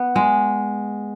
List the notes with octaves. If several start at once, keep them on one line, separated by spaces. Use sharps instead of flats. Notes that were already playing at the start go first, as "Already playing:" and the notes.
Already playing: B3
G#3